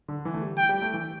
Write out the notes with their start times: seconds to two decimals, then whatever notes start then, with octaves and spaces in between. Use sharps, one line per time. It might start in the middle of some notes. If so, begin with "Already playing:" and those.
0.08 D3
0.25 E3
0.34 A3
0.42 G3
0.58 G5
0.69 G3
0.82 A3
0.94 E3